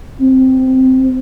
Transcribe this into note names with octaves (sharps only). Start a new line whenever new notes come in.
C4